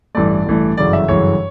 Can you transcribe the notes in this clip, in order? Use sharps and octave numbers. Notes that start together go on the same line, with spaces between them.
A1 G2 E3 A3 D5
A1 G2 E3 A3
G1 F#2 C#3 E3 D5
E5
G1 F#2 C#3 E3 C#5